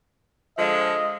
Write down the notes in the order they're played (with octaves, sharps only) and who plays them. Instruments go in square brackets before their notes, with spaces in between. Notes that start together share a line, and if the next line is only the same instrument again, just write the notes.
[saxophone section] D3 F3 G#3 [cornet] D#5